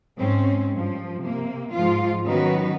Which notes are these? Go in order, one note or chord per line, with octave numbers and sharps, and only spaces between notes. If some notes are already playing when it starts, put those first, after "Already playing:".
G#2 C4 C#4
G2 F3
C3 A#3
G#2 F3 F4
D#3 F#3 B3 C#4 F#4 B4